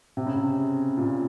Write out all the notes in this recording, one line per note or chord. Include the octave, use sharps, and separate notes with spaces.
C3
C#3
C3
A#2